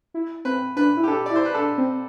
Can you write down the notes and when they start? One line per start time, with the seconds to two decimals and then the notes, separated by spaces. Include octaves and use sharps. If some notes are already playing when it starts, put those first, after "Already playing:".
0.14 E4
0.45 C4 B4
0.76 D4 B4
0.97 E4
1.03 G4
1.07 D4 A4
1.26 D5
1.31 E4
1.36 C5
1.45 B4
1.54 D4 A4
1.78 C4